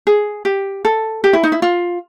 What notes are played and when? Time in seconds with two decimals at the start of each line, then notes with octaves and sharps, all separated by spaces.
0.07 G#4
0.45 G4
0.85 A4
1.24 G4
1.33 E4
1.43 D#4
1.52 E4
1.62 F4